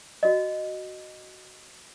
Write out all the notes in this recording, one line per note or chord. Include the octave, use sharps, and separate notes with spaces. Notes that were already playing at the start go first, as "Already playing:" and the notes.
F#4 D#5